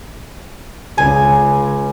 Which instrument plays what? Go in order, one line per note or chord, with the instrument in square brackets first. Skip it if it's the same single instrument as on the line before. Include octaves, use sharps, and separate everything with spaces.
[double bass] C#2 [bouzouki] G#5